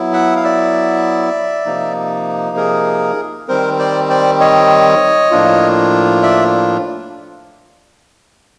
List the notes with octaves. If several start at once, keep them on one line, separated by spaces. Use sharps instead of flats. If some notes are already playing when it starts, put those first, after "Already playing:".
Already playing: F#3 B3 E4
E5 F#5
F5
D5 E5
C3 F3 A#3 D#4
G#4 A#4
D#3 G3 C4 A#4 C5
C5 D5
C5 D5
C#5 D#5
A2 F3 A#3 D4 F4
D5 E5